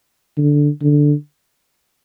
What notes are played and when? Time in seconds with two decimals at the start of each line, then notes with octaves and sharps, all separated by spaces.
0.37 D3
0.82 D3